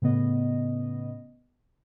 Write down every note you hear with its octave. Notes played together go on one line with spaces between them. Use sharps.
A2 C#3 B3 D#5